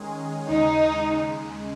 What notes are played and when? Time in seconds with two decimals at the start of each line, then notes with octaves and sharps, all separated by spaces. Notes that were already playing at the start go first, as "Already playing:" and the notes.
Already playing: D#3 G#3 C#4 G#4
0.49 D#2 C#3 G#3 D#4